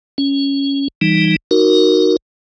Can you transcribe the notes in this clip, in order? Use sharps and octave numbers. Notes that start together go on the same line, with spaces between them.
C#4
E3 G3 D#4
D#4 F#4 A#4